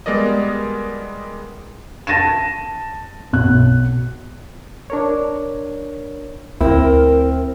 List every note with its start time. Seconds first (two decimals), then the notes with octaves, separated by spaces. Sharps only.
0.06 G3 G#3 B3 A#4 D5 D#5
2.07 A5 A6 A#6 D#7 E7
3.33 B1 F#6
4.90 D4 A#4 C#5
6.61 D2 C4 E4 A#4